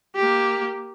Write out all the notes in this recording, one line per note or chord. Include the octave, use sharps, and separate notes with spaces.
A#3 G4